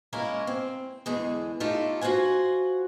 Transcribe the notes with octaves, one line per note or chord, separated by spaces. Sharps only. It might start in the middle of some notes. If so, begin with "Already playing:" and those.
G#3 A#3 C#4 E4 F4 A#4
C4
E2 D3 G#3 G#4
A3 D#4 F4 G4 A4
F4 F#4 C5 F#5 G#5